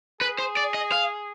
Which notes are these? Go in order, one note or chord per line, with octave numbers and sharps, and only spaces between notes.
G#4 B4
C5
D5
D#5
F5